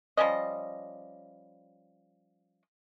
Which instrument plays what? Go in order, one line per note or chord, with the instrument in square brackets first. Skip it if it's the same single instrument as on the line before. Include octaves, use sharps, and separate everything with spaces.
[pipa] F3 G3 C#4 D#5